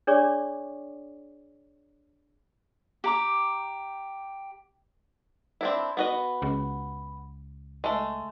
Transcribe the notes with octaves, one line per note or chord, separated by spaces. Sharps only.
D4 G#4 C#5 D5 C#6 D6
G4 A#5 D6
C4 D4 E4
B3 F#4 D#5
C#2
G#3 A3